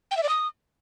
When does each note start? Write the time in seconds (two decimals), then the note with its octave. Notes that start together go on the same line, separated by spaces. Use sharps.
0.11 G5
0.17 E5
0.23 D5
0.29 D#6